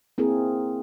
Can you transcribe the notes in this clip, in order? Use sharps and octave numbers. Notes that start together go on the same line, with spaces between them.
A#3 C4 E4 G#4 A#4